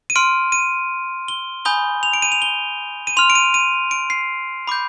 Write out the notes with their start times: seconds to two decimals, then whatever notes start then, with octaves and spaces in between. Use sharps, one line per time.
0.10 D#7
0.16 C6 F6 D7
0.52 D#7
1.28 G7
1.65 G#5 B5 D#6 G6 G7
2.03 F7
2.13 D7
2.22 D#7
2.32 F7
2.42 G7
3.07 D#7
3.17 C6 F6 F7
3.30 D7
3.35 D#7
3.54 D#7
3.91 D7
4.10 C7
4.67 B5 D6 G6